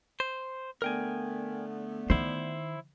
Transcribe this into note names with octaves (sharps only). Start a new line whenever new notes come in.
C5
D3 A3 B3 A#4 G5 G#5
D#3 E4 C5